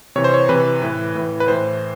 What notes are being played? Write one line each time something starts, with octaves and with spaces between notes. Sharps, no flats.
C3 E3 C#5
C5
C#5
C3 E3 B4
A2 E3
A2 E3
B4
A2 E3 C5